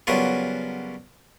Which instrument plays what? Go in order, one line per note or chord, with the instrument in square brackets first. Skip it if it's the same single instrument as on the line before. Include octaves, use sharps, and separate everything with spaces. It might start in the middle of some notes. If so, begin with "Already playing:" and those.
[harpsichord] C#3 F#3 G3 B3 F4 A#4